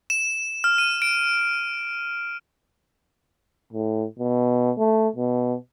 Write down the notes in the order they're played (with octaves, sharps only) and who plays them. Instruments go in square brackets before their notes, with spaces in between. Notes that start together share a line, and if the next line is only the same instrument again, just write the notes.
[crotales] E7
F6
D#7
D7
[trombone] A2
B2
A3
B2